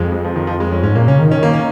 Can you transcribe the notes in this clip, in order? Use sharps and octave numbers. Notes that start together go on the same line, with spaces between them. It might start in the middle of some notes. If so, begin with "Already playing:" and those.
Already playing: F2 G#3
G#3
F3
D#3
F3
G#3
C#4
G#2 C#4
A#2 A#3
C#3 C#4
D#3
C#4
A#3
C#4